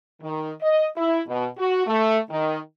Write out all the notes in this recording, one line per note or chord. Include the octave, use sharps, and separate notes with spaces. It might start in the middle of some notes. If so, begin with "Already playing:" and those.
D#3
D#5
E4
B2
F#4
A3
D#3